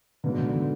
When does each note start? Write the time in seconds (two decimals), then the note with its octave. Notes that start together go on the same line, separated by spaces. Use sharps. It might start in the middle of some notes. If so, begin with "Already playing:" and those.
0.24 G#2 D3 F#3 B3
0.38 D3
0.53 D3